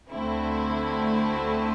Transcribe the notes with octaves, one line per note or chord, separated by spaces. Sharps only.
D2 D3 A3 C4 E4